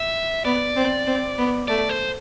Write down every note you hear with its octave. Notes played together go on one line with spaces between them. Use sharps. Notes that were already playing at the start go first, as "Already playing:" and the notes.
Already playing: E5
B3 D5
C4
C4
B3
A3 D5
C5